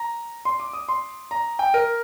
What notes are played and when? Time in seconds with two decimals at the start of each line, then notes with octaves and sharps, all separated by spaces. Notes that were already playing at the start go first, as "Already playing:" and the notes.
Already playing: A#5
0.45 C6
0.60 D6
0.73 D#6
0.88 C6
1.31 A#5
1.59 G5
1.74 A#4